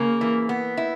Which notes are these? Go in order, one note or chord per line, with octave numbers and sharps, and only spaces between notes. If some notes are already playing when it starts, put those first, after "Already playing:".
Already playing: C#3 A#3
E3
B3
E4